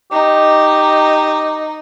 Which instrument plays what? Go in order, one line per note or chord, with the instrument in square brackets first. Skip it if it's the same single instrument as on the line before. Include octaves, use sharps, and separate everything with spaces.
[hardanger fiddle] D#4 [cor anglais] G4